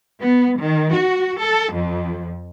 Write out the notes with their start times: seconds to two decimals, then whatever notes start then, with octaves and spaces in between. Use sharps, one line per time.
0.21 B3
0.59 D#3
0.92 F#4
1.40 A4
1.74 F2